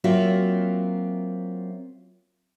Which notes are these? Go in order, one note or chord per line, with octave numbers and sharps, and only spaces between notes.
F#3 A#3 C4 F4 F#4 E5